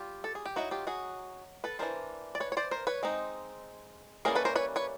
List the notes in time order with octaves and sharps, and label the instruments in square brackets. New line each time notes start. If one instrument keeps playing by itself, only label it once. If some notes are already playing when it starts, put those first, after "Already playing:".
Already playing: [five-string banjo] G3 F4 G4
A4
G#4
G4
F#3 A#3 D#4 E4 F#4
F4 G4
F#4 G#4
A4 B4
E3 A3 D4 A#4 C5
D5
B4 C#5
C#5
C5 D5
A#4 C5
B4 C#5
G#3 C4 D#4
E3 G3 A#3 C#4 G#4 A#4
A4 B4
A#4 C5
B4 C#5
B4 C#5